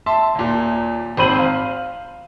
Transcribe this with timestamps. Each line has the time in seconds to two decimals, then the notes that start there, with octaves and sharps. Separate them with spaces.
0.06 E5 A5 C6
0.35 D#1 A#2
1.17 G#1 C4 C5 B5 D#7 F#7
1.39 F5